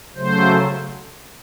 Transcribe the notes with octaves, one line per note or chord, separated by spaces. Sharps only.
C#3 F#3 A3 C5